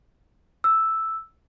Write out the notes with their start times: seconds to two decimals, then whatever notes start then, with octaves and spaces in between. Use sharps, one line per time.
0.64 E6